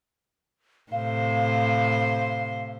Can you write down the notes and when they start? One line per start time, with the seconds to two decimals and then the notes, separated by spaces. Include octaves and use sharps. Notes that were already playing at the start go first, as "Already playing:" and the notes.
0.92 A2 C3 C5 F5